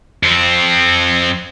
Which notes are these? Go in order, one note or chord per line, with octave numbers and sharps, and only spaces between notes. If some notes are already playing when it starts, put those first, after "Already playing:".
F2 C4